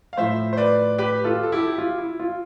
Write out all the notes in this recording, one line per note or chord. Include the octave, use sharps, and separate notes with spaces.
F5
A2 F3 C5 E5
C5
B4 D5
G4 B4
F4 A4
A4
E4 G4
G4
F4
E4
F4